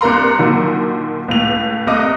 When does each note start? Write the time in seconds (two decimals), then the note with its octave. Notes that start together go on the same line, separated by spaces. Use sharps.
0.01 C2 D4 A#4 A#5 C6
0.38 A#2 D3 D#3 F#3
1.28 C#2 A2 F7
1.87 C2 A3 D#5 D6 D#6